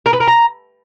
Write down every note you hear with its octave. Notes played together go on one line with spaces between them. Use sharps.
A#4
B4
A#4
A#5